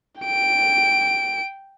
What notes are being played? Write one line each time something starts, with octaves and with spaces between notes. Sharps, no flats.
G5 D7